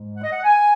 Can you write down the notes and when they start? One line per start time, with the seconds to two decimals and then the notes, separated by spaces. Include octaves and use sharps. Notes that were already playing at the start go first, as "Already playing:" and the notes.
Already playing: G#2 G#3
0.16 F#5
0.23 D#5
0.32 F#5
0.44 G#5